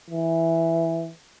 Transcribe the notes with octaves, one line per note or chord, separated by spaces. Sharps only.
E3